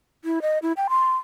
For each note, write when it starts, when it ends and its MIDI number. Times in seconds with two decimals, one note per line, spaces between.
0.25 0.42 64
0.42 0.58 75
0.62 0.73 64
0.77 0.87 79
0.89 1.16 84